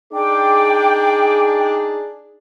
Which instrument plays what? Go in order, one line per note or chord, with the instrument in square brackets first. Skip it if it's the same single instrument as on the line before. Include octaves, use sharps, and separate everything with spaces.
[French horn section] D4 D#4 G#4 [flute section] G5 D6